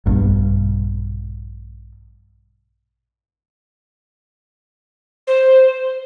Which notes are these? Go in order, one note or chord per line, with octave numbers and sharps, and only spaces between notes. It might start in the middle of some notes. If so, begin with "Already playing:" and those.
A#1 G2 B2
C5